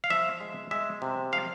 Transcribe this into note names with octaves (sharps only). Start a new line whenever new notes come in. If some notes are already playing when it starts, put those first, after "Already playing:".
F5
F3 E5
G#3
G#3 E5
C3
F3 F5